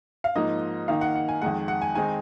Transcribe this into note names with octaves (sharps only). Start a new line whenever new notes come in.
F5
G#2 F3 A#3 D#4 D#5
D#3 A#3 D#4 F5
F#5
F#5
G#5
F2 D#3 G#3 F#5
F#5
G#5
D#3 G#3 C4 D#4 G#5